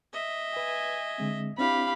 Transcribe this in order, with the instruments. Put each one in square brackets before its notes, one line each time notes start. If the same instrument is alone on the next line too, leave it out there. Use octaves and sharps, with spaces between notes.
[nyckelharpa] D#5 E5
[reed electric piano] B4 [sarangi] G#5
[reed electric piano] D3 G#3 C4
[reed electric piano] C4 D4 E4 [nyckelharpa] G4 F5 [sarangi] B5